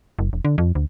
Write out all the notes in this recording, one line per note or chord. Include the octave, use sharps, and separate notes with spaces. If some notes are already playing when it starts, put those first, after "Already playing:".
F#1
E1
D3
F2
D2